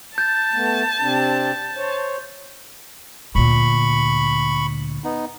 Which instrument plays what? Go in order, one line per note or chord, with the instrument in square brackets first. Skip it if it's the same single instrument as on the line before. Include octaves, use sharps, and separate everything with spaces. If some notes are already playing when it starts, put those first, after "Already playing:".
[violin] A5 [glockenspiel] G6 A6
[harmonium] A3 B3
C3 C4 D4
C5 C#5
[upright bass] D2 A#2 [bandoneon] B5 C#6
[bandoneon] B3 D#4